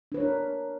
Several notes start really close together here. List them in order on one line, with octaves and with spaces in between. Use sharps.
D4 B4 C#5 A#4